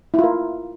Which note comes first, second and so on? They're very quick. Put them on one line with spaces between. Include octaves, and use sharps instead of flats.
E4 F4 A#4